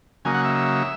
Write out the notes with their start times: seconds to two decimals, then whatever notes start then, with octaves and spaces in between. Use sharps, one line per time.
0.25 C#3 F#3 A#3 D#4 G#5
0.34 F#5
0.44 E5
0.55 E5